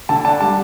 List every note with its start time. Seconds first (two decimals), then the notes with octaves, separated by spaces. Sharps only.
0.09 D3 A5
0.25 D4 A5
0.41 G3 A5